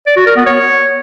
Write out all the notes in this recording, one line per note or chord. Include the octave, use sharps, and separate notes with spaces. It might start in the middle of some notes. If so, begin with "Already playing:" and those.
D5
F#4
A#4
B3
C#5